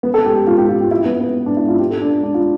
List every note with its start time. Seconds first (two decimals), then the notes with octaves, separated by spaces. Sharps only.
0.03 B3
0.14 A4
0.25 G4
0.36 G4
0.47 F4
0.58 G4
0.69 F4
0.80 G4
0.91 E4
1.06 B3
1.20 B3
1.46 D4
1.57 E4
1.69 F4
1.79 G4
1.90 A4
2.02 D4
2.23 D4
2.34 F4